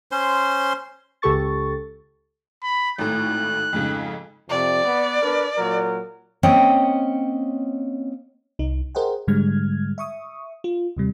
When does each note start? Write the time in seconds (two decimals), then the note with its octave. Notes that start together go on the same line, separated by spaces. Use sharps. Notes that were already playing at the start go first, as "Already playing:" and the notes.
0.11 C#4 C5 C6
1.22 C#2 C#3 G4 A4 C#6 A6
2.63 B5
2.98 G#1 A2 F#6
3.73 F2 G#2 C#3
4.50 F2 C3 D5
4.85 B3
5.22 D4 A#4 B4
5.57 A#2 F#3 A#4
6.43 A#3 C4 C#4 D#5 F#5 G5
8.59 C2 D#4
8.95 G#4 A#4 C5 D#5 F#5 G5
9.28 G#2 D3 G3 G#3 F6 G#6
9.98 E5 C#6 D#6
10.64 F4
10.97 D#2 C3 G3